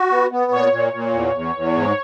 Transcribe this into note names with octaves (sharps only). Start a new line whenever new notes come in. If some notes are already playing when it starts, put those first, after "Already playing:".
Already playing: F#4
B3
B3
A#2 C#5
A#2
A#2
E2
E2
E2
G#2